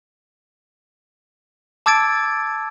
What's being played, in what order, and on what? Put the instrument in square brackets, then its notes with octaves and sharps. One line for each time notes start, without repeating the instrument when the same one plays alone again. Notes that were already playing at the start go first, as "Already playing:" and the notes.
[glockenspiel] A5 D6 E6 G#6 A6 D7